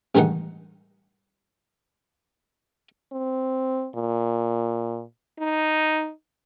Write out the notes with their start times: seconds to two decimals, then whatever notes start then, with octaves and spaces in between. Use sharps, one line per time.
0.15 A1 G2 D#3 G#3 D#4 F#5
3.13 C4
3.96 A#2
5.40 D#4